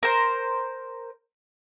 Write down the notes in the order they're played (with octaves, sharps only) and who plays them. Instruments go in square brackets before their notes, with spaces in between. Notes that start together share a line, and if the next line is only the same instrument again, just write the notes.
[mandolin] A#4 C5